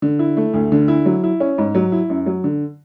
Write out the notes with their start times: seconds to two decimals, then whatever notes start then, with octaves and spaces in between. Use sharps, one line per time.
0.02 D3
0.19 E4
0.37 A3
0.54 D2
0.72 D3
0.88 E4
1.05 F#3
1.24 E4
1.40 C#4
1.58 G#2
1.75 F#3
1.92 E4
2.10 F#2
2.26 F#3
2.44 D3